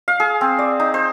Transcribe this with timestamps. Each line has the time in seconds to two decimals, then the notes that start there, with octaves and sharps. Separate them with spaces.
0.08 F5
0.20 G#4
0.41 C4
0.59 D5
0.80 D#4
0.94 C5